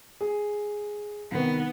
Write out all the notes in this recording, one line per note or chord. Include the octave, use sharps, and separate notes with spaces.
G#4
C2 D#3 B3